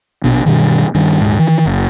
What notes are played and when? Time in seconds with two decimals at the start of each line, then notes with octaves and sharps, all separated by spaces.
0.24 A#1 B2 D4
0.46 G2 B2 D#3
0.95 G2 D#3
1.21 D#1 B1 G#2
1.39 D#3 E3
1.66 F#1